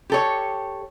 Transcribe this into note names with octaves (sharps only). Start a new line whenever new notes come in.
G4 A4 C#5